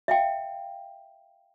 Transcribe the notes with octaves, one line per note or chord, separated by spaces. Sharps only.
E5 F5 G5